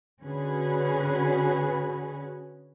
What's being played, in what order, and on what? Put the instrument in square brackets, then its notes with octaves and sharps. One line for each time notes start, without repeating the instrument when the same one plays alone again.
[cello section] D3 C#4 F#4 G#4 B4